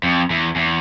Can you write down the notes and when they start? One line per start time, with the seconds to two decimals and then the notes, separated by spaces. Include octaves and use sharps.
0.03 F2
0.30 E2
0.56 E2